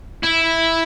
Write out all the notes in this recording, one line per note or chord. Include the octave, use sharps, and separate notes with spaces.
E4